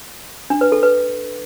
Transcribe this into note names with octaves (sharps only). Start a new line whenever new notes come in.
D4
B4
A4
B4